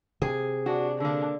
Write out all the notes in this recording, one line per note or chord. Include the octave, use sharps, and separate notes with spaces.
C3 G#4
D4 F#4
D3 A#3 D4